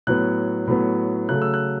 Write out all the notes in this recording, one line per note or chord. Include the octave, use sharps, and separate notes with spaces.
A2 F#3 B3 F#6
A2 F#3 B3
C#3 F#3 A3 F#6
E6
F#6